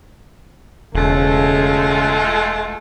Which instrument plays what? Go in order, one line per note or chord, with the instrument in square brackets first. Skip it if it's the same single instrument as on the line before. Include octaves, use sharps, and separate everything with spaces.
[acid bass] E1 [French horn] C#3 [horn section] G#3 A3 F4